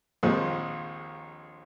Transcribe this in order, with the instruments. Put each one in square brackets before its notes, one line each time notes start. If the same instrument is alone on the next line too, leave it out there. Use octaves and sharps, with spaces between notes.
[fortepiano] A#1 D#2 G#3 C4 F4